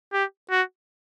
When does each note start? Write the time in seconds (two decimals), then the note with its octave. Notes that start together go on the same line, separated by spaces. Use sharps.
0.13 G4
0.51 F#4